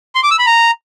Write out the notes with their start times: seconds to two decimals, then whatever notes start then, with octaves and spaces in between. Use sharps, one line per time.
0.15 C6
0.23 D6
0.31 E6
0.39 B5
0.47 A#5